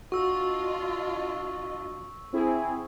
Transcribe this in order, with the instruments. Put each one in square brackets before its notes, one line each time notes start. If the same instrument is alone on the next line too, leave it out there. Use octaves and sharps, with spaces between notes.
[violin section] D4 F4 D#5 [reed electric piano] F#4 [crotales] C#6 E6
[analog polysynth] C4 E4 G#4